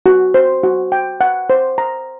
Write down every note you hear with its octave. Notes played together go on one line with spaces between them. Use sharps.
F#4
C5
F#4
G5
F#5
C5
A#5